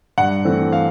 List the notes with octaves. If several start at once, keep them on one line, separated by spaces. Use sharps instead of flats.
G2 F#5
E3 A3 C4
F5